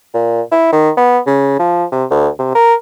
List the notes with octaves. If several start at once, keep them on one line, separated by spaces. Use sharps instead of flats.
A#2
E4
D#3
B3
C#3
F3
C3
D2
C3
A#4